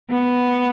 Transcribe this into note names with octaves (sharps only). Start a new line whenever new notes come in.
B3